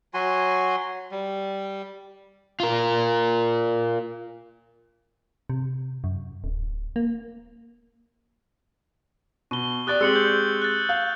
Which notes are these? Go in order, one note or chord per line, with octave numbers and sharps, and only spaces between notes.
F#3 F#4 G#5 C6
G3
F4 A#4
C3
F#2
D1
A#3
B2 C#6 G7
G4 D5 D#6 F#6 A6
G#3 C4 G4 E6 C#7 F#7
G6
F#6 A6
F5